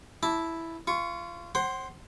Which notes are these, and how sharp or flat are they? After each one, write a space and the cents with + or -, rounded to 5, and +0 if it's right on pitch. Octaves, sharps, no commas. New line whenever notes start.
E4 +0 A5 +0 D6 +0
F4 -25 C#6 +0
C5 +35 F#5 +35 C6 +0